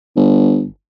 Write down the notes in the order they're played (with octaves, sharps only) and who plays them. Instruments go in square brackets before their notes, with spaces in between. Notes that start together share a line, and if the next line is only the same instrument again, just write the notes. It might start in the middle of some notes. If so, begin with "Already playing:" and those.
[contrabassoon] G1